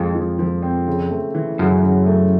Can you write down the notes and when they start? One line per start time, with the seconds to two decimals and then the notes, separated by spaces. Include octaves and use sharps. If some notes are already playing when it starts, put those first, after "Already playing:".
Already playing: F2 F3 G#3 C4
0.15 F3
0.39 F3
0.62 C4
0.87 C#3
1.11 A3
1.35 E3
1.59 F#2 C#3
1.84 C#3
2.07 A3